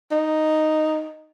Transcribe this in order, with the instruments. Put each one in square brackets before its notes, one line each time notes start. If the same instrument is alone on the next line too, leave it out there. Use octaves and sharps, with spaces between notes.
[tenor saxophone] D#4